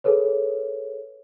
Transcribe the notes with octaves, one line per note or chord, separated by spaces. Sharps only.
G#4 A4 B4 C#5